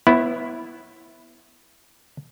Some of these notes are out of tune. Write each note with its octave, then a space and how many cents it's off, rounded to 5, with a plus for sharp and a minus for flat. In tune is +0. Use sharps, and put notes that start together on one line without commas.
B3 +0 E4 +0 C#5 -45